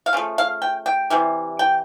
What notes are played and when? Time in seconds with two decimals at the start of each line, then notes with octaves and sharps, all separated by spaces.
0.06 F5
0.13 C#3 F3 A3
0.38 F5
0.62 G5
0.86 G5
1.10 C3 E3 G3
1.59 G5